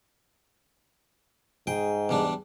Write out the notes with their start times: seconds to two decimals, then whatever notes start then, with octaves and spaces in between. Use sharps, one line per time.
1.67 G#2 G#4 G5
2.09 E2 G3 D4